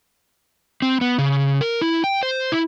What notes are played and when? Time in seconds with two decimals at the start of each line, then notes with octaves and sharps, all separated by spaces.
0.82 C4
1.01 B3
1.18 C#3
1.61 A#4
1.82 E4
2.04 G5
2.23 C5
2.52 E4